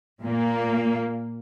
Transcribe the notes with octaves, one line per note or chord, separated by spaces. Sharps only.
A#2 A#3